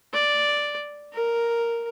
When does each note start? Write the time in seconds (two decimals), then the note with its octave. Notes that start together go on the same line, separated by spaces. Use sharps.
0.13 D5
1.13 A#4